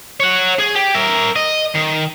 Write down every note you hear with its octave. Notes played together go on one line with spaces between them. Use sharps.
C#5 F#5
G#4
G4
A#4 E5
D#5
D#3